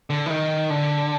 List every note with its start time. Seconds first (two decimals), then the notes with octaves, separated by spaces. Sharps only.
0.10 D3
0.26 E3
0.30 D#3
0.70 D3